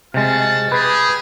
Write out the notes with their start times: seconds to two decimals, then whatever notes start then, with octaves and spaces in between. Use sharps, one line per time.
0.14 C3 G#3 F4 F#4 A5
0.72 G4 G#4 B4